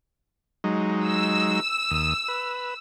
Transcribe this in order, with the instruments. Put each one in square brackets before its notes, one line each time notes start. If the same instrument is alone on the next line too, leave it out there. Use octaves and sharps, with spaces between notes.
[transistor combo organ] F#3 G#3 D#4
[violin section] E6
[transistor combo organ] D#2 D#6
B4